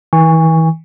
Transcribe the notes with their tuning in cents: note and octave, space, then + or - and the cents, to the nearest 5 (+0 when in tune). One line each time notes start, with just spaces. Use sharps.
E3 -40 G#5 -30 C#6 +10